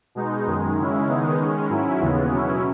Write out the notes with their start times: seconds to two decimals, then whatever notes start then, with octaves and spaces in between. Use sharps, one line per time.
0.15 B2 G#3 D#4
0.46 F#2 D#3 G#3
0.77 C#3 G#3 C#4 E4
1.08 D#3 G#3 B3 D#4
1.38 D#3 G#3 C#4
1.69 G#2 F#3 C#4 E4
2.00 D#2 C#3 E3 G#3 B3
2.31 B2 F#3 C#4 E4